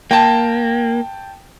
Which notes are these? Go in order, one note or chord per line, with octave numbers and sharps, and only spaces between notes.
A#3 G5 A5